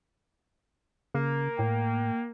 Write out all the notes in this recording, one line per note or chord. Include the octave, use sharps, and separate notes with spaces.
C#3 A#3
A2 G5